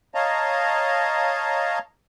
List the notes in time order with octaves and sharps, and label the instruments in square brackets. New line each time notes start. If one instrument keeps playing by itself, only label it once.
[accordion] C#5 D#5 F5 A5 A#5